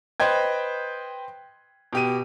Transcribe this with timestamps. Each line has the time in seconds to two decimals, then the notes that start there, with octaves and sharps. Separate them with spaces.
0.20 B4 C5 D#5 G5 G#6
1.93 B2 G4 D#7